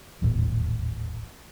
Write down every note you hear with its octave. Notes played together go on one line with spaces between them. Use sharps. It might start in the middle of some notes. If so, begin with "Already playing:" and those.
D#1 A1 E2